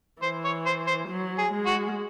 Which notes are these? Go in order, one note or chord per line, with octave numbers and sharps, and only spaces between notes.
E3 C5
C#5
C5
C5
F#3
G#4
G#3
F#4